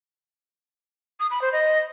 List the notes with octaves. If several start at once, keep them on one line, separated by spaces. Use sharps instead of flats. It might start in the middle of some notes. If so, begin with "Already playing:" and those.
D#6
B5
C5
D#5